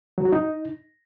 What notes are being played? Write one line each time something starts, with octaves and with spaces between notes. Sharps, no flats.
F#3
F#4
D#4